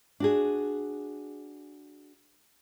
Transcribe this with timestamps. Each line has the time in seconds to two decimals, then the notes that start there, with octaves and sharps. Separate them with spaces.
0.20 D4 F#4 G#4